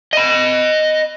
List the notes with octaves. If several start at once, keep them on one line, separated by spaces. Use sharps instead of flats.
D#5 B5